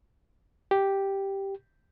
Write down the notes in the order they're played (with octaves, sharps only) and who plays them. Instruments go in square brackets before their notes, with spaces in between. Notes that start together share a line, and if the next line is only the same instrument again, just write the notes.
[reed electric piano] G4